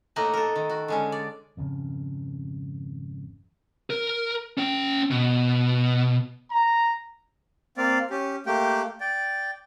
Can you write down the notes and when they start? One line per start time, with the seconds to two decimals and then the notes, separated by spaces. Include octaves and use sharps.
0.16 A2 A#3 D#4 D#5 F#5
0.33 A4 A#4
0.56 D#3
0.70 F#4
0.88 D3 G#3 C#4
1.12 D5
1.57 G#1 F2 C#3
3.90 A#4
4.58 C#4 G5
5.11 B2
6.51 A#5
7.78 A#3 C4 D5 F5
8.10 C#4 G4
8.46 A3 A#3 G4 G5
9.01 D5 G5